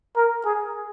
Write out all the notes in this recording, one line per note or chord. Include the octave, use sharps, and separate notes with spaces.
A#4
G#4